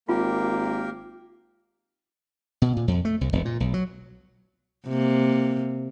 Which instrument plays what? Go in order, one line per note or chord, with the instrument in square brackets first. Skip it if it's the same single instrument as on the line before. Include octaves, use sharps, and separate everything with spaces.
[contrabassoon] G#1 [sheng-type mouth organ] A#3 G4 A#4 [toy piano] F4
[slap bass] B2
A#2
F2
A3
C2
E1
A#2
B1
F#3
[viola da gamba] C3 A#3